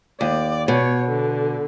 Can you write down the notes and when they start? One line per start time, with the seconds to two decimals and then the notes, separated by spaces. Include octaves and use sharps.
0.21 D#2 D5
0.68 B2 C#5
1.10 D3